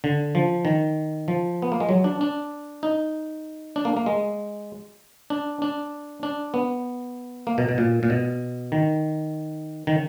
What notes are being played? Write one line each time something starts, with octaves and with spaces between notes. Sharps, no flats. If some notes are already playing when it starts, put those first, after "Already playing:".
D3
F3
D#3
F3
B3
A#3
G#3
F#3
D4
D4
D#4
D4
A#3
A#3
G#3
D4
D4
D4
B3
A#3
B2
B2
A#2
A#2
B2
D#3
D#3